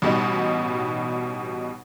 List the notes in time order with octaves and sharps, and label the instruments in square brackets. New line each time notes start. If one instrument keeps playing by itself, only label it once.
[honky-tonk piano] A1 B2 G3 D#4